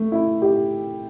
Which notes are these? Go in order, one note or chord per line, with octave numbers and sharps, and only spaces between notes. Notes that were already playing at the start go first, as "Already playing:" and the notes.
Already playing: A3
E4
G4